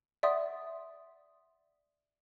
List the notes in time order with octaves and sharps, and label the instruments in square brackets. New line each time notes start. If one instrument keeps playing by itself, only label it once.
[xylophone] D5 E5 F#5 C6 D#6